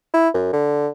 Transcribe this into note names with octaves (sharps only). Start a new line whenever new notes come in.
E4
F#2
D3